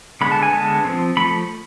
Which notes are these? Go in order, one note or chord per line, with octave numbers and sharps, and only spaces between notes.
D3 G#3 B3 B5
A5
G#5
D3 G#3 B3 A5
F3 A3 C4
F3 A3 B5